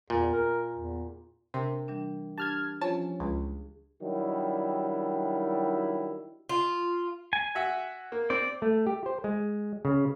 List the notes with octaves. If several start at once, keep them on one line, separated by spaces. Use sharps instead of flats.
E2 A#2
A#4
E2
C3 D4 A#4
E3 G3 D4
D4 G4 A5 F6 G#6
F3 C#4 A5
C#2 G#4
D#3 F#3 G3 D4 E4
F4
G#5
F#4 E5 F#5
A#3
C4 D5
A3
G4
C5
G#3
C#3